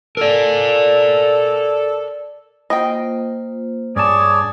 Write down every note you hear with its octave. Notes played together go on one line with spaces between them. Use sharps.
A4 A#4 D5
A#3 F4 C5 D#5 G5
G2 G#4 C#5 D5 A5